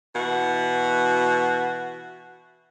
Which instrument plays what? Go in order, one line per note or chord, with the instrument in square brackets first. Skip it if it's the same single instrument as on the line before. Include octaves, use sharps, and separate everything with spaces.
[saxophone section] B2 E3 F#4